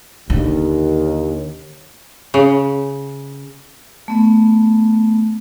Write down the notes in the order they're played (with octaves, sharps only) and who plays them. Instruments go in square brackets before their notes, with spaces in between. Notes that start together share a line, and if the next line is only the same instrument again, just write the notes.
[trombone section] D#2 [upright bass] D3
[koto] C#3
[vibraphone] A3 B3